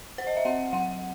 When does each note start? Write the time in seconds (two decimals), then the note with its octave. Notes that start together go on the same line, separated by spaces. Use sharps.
0.18 C5
0.27 D#5
0.37 E5
0.45 C4 F#5
0.73 F#3 F#5